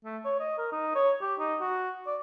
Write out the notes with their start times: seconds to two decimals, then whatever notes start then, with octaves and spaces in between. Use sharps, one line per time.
0.05 A3
0.25 C#5
0.40 D#5
0.58 A#4
0.72 D#4
0.95 C#5
1.22 G4
1.39 D#4
1.60 F#4
2.07 D5